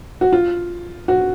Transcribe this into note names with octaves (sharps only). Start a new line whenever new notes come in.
F#4
F4
F#4